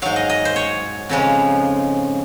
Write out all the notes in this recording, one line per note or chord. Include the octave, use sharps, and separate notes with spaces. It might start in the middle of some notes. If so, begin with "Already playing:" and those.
G#2 F#3 F5
D#5
D#5
C5
C#5
F2 C#3 F3 G#3